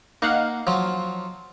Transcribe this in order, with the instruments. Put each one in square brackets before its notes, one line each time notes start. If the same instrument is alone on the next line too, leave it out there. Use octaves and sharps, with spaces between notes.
[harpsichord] A#3 [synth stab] D#4 F5 F#5
[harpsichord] F3 F#3